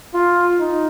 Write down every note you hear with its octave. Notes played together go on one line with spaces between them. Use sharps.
F4
D#4